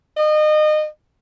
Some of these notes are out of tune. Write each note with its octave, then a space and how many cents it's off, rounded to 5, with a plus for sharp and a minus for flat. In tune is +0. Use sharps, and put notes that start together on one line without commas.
D#5 -30